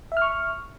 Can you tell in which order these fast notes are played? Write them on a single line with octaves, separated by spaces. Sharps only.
E5 F6 C#6